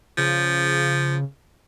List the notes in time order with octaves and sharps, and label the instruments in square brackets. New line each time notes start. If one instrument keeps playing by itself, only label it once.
[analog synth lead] C#3 [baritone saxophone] F3